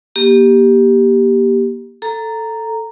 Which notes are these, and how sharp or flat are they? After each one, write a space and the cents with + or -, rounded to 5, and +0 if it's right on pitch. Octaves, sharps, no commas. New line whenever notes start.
A#3 +35 G4 +0
A4 +0 A#5 -5